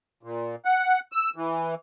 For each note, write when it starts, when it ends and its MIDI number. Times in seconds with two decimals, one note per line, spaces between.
0.23 0.56 46
0.65 1.00 78
1.12 1.30 88
1.36 1.75 52